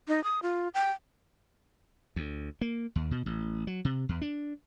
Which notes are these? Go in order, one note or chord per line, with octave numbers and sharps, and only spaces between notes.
D#4
D#6
F4
G5
D2
A#3
D#2
B2
A1
F#3
C3
E2
D4